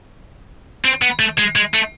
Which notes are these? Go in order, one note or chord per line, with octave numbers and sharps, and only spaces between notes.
C4
B3
A3
G#3
G#3
A3